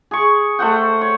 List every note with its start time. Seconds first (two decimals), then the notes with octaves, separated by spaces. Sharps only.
0.11 G#4 C#6
0.59 A3 C5 F#5 G5
1.01 C#5